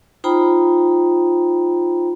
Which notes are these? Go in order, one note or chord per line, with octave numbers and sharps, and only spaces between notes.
D#4 F4 C5 G5 A#5 B5